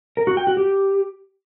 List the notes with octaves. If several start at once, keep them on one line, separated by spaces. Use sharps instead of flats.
A#4
F#4
G5
F#4
G4